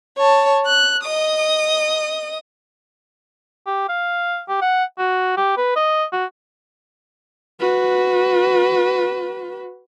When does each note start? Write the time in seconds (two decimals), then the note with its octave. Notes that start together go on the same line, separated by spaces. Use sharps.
0.17 C#5 A5
0.66 F#6
1.03 D#5 D#6
3.67 G4
3.89 F5
4.49 G4
4.62 F#5
4.98 F#4
5.37 G4
5.57 B4
5.76 D#5
6.13 F#4
7.60 F#4 B4